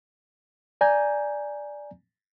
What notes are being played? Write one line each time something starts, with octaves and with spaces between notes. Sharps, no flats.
D5 G#5 A#5 G6